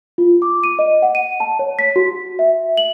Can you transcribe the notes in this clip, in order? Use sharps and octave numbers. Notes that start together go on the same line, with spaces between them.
F4
D6
D#7
D#5
F#5
D#7
A5
C#5
B6
F#4
E5
F#7